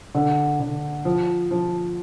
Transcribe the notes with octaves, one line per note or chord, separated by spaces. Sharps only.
D3
D3
F3
F3